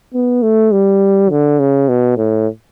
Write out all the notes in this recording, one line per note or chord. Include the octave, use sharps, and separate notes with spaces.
B3
A3
G3
D3
C#3
B2
A2